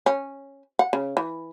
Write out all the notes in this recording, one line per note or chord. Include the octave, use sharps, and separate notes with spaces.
C#4
F#5
C#3
E3